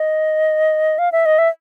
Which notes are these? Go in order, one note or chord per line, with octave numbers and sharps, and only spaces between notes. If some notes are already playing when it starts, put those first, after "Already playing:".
Already playing: D#5
F5
E5
D#5
E5